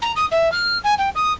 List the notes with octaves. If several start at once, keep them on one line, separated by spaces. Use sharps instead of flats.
A#5
D#6
E5
F6
G#5
G5
D#6